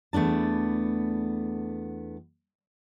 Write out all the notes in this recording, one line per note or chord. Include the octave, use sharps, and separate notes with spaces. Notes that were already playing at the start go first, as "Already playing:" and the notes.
E2 A3 B3 D4 A5